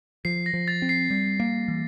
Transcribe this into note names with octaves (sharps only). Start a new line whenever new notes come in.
F3 C7
A#6
F3
A6
C4
C7
G3
A#3
E3